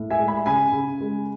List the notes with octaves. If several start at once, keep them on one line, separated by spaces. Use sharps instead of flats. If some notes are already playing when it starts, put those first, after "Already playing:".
Already playing: A2
E5 G#5
G#3
G#5 B5
C#3 G#5 B5
C#3
G#3